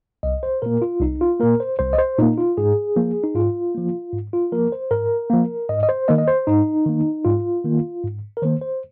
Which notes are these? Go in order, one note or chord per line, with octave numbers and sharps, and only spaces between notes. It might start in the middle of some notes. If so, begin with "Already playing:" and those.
C2 D#5
C5
A#2 A#3 A#4
F4
C2 D#4
F4
A#2 A#3 A#4
C5
C2 C5
D#5
C5
A#2 A#3 D#4
F4
G#2 G#4
F3 A#3
D#4
G#2 F4
F3 A#3
G#2
F4
F3 A#3 A#4
C5
G#2 A#4
F3 A#3
G#2 D#5
D#5
C5
D#3 A#3 D#5
D#5
C5
G#2 D#4
D#3 A#3
G#2 F4
D#3 A#3
G#2
A#4
D#3 A#3 C5
C5